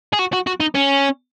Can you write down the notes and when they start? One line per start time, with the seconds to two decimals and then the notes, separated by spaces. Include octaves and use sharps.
0.13 G#4
0.19 F#4
0.33 F#4
0.47 F#4
0.60 D#4
0.75 C#4